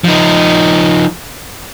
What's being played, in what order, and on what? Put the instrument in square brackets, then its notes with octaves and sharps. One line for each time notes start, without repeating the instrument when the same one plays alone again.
[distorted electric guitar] F3 D#4